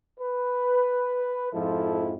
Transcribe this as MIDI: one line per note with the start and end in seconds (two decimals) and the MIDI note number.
0.20 1.51 71
1.53 2.14 41
1.53 2.14 44
1.53 2.14 53
1.53 2.14 64
1.53 2.14 69